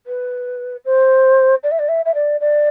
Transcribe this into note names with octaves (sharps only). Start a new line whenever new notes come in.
B4
C5
D5
E5
D5
E5
E5
D5
D5